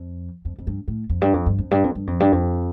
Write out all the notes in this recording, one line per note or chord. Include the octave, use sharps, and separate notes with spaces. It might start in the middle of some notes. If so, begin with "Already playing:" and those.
Already playing: F2
F2
F2
G2
A2
F2
G2
F2
G2
F2
G2
F2
G2
F2
G2
F2